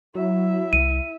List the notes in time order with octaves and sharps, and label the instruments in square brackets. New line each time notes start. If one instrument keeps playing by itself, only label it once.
[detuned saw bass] F#3 [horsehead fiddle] E4 E5
[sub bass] C2 [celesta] D#7